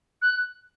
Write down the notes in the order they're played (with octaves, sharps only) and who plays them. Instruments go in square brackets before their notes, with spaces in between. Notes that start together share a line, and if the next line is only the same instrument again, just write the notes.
[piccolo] F#6